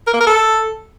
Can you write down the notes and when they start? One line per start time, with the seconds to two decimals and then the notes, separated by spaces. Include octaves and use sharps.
0.07 A#4
0.14 A#3
0.20 A#4
0.27 A4